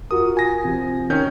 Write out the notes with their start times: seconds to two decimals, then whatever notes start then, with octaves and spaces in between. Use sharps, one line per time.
0.11 F4 F#4 A#4 D#6
0.37 G#5 A#6
0.63 C3 F3
1.10 D#3 C#4 G6